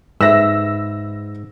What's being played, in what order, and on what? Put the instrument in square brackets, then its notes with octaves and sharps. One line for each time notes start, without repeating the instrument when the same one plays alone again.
[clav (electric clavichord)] G#2 [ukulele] B4 E5 [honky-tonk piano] E6 A#6